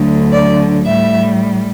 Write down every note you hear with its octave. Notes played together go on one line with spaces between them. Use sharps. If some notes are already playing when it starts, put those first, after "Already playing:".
Already playing: D2 D3 F#3
D5
A2 G3 E5